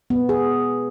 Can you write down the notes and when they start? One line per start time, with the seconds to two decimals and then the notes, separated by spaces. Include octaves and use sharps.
0.10 B3
0.29 G#4